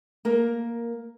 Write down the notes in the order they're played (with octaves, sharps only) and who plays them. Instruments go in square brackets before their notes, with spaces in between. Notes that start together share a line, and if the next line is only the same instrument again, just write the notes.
[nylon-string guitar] A#3 A#4